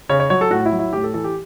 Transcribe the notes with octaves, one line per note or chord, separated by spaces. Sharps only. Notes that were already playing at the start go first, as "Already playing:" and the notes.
C#3 C#5
C#5
F#3 C#5
A4
A2 F#4
E4
F#3
E4
A2 G4
A4
E3 A4
G4